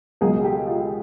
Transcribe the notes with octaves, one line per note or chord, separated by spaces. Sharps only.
C#2 B2 F#3 G#4 A#4
G4 A4
F4 G4